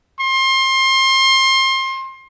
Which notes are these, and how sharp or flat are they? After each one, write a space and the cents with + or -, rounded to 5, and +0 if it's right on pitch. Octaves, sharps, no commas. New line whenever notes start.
C6 +30